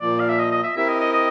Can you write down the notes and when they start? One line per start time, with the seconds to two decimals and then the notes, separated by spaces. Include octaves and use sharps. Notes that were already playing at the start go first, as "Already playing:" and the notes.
0.01 A#2 F3 A#3 D5
0.20 F5
0.30 E5
0.39 D#5
0.52 D#5
0.64 E5
0.76 C4 E4 G4 A#4 E5
0.88 D#5
1.01 D#5
1.13 D#5